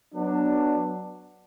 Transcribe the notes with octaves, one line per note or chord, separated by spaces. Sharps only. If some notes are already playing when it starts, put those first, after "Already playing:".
F#3 B3 D4